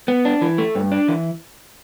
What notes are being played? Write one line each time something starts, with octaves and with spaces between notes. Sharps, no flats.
B3
D4
E3
A3
G2
D4
E3